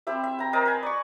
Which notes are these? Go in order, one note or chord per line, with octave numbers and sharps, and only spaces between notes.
C4 E4 G4 E5
E5
G5 A#5
A#4 C5 D#5 A5
B4 G#5
D5 C#6